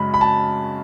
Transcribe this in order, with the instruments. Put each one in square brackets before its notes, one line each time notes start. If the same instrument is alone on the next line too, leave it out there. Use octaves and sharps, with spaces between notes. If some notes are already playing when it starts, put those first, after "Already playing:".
Already playing: [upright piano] F#2 C#3 G#3 C#4 [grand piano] B5
[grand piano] B5
A5